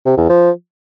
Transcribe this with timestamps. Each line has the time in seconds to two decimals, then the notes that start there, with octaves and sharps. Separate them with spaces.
0.05 C3
0.17 E2
0.29 F3